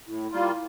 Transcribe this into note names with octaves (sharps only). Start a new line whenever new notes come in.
A2 E4
G3 A#3 F4